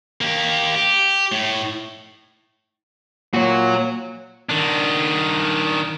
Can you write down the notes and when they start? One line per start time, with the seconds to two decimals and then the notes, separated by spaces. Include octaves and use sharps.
0.21 A#3 G4
0.75 G4
1.32 A2
3.34 A#2 F#4 C#5
4.49 D#3 D4